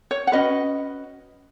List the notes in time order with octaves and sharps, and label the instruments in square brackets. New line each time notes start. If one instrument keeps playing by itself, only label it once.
[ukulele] C#5
F#5
C#4 F#4 B4 D#5